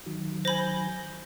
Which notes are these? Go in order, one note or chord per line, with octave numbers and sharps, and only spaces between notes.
D#3 F#3
C5 G#5 B5 G6 A#6